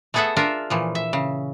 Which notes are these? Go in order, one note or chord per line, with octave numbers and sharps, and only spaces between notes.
A3 B3 G#4 A4 E5 F#5
D4 F4 A#4 E5
A#2 E3 F3
E5
C#3